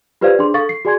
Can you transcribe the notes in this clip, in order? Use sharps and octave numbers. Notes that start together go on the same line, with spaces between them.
F4 G4 B4 C5 D5 F5
D4 G#4 C6
A4 F5 C#6 A6
C7
F#4 G#4 D5 G#5 C6 G#6